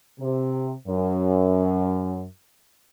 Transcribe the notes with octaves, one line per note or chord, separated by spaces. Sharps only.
C3
F#2